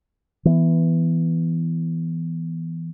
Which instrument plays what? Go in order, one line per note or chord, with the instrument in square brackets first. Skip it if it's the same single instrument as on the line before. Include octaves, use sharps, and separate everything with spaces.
[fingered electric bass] E3 B3